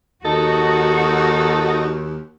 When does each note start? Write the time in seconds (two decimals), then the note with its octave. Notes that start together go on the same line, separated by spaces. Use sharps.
0.25 D#2 D#4 F#4 A4